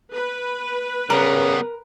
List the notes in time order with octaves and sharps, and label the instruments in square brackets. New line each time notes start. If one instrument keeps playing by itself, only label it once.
[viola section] B4
[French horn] C#3 [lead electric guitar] G3 B3 [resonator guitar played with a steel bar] A#4